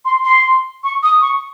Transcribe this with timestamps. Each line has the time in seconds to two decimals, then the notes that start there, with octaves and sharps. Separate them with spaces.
0.05 C6
0.24 C6
0.84 C#6
1.03 D#6
1.21 C#6